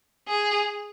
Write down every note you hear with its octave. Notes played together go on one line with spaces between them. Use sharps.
G#4